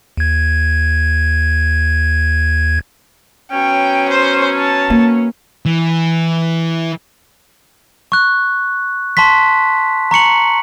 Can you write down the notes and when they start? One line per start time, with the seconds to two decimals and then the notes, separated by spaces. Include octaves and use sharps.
0.17 D#2 G#6
3.51 F#3 B3 C#4 G5
4.09 C5
4.57 A5
4.90 A#3
5.66 E3
8.12 C#6 F#6
9.17 A5 C6 C#6 B6
10.11 A#5 C#6 C#7 F#7